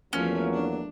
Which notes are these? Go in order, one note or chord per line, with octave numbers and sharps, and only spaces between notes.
E2 F3 F#3 A3 A#3 C#4 F4
D4